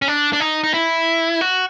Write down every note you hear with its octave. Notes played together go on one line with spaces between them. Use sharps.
C#4
D4
D4
D#4
D#4
E4
F#4